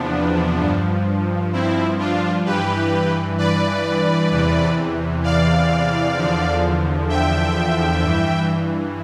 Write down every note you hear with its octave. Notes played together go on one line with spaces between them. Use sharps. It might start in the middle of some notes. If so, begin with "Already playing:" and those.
Already playing: E2 C3 F3 B3 D4
G2 F3
C4 E4
D4 F4
G2 E3 G4 B4
B4 D5
E2 C3 E3
D5 F5
E2 D3 F3
E5 G5
G2 E3